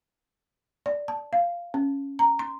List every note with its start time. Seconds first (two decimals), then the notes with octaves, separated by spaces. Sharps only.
0.86 D5
1.08 A5
1.33 F5
1.74 C#4
2.19 A#5
2.39 C6